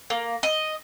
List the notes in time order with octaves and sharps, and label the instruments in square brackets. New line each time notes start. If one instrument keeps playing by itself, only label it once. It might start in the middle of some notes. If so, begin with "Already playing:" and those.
[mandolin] A#3
D#5